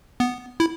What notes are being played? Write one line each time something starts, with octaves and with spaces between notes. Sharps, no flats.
B3
E4